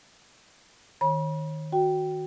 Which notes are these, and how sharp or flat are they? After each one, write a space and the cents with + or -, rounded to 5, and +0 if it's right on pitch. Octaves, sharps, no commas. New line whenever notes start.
D#3 +0 C#5 -30 B5 -40
F#4 +0 G5 -10